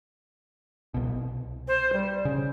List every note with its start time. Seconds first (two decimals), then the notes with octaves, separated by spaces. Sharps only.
0.94 C2 B2
1.67 C5
1.92 G3
2.25 C#3